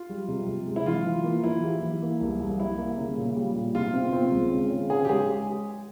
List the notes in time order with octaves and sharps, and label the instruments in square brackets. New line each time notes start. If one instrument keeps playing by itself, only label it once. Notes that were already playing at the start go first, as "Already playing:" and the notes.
Already playing: [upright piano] F4
[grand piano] G3
C3
C3
G#3
[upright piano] E4
[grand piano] E3 [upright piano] F4
[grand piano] E3
A#3
[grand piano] E3 [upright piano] E4
[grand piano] G4
E3
A#3
C2
C2
[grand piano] G3 [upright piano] E4
[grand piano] A#3
C#3
A#2
G3
A#2
[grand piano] C3 [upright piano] F4
[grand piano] C4
C4
C#2
C#3
C#3
[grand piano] C#4 [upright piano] G#4
[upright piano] G4
[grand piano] G#3 [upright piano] G#4